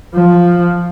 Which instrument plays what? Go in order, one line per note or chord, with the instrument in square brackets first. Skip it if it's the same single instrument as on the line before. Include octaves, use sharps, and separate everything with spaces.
[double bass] F3